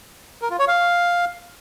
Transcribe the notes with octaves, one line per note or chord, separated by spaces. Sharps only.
A#4
F4
C#5
F5